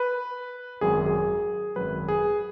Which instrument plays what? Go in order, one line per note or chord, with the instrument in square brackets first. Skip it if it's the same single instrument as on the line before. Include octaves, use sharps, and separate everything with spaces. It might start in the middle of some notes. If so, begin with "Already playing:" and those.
Already playing: [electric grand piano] B4
G#1 F#2 F#3 G#4
G#4
G#1 F#2 F#3 B4
G#4